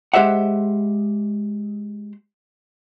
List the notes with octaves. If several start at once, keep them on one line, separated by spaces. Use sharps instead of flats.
G#3 G4 C5 E5 F#5